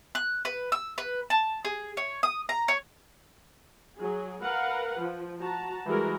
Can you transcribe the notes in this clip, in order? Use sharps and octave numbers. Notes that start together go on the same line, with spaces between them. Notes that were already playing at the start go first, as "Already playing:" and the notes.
F#6
B4
E6
B4
A5
G#4
C#5
D#6
A#5
C#5
F#3 G#4
A#4 B4 F5 F#5
F3
F#4 A5 A#5
E3 G3 G#3 F#4 G#4 A#4